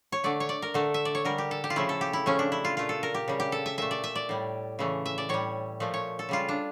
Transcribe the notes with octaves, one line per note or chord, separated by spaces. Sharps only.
C#5
D3 A3 D5
C#5
D5
A#4
D3 A3 A4
E5
D5
C#5
D3 G3 A#4
G4
A4
G4
F4
C#3 F3 A3 E4
A4
G4
E4
C#3 F3 A3 C#4
D4
E4
F4
A#2 A3 F4
A4
A#4
G4
C#3 G3
G4
A4
E5
A#2 A3 E5
D5
E5
D5
A2 G3
C#3 E3 A3
E5
D5
A2 G3 C#5
A#2 F3 A3
C#5
A4
C#3 G3 F4
D4